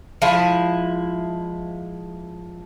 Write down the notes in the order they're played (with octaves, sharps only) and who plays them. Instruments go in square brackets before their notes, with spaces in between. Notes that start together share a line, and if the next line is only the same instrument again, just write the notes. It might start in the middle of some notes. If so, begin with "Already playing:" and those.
[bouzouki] F3 G#3 E4